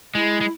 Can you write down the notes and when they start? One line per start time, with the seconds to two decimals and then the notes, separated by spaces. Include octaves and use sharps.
0.15 G#3 E4
0.41 G#3